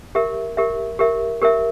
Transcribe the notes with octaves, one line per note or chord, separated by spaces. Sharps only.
G4 A#4 E5
G4 A#4 E5
G4 A#4 E5
G4 A#4 E5